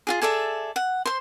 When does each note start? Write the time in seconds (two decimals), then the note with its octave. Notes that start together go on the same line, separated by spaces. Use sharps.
0.07 F4 F#4 G#4
0.21 G#4 A4 D5 E5
0.76 F#5
1.05 C5 C6